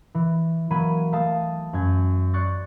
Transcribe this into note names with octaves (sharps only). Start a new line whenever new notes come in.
E3
E3 F#3 A#3 B5 G#6 D#7
A3 F5 A5 D#6
F#2 G#6
D5 C6 C#6 F#6 G6 A6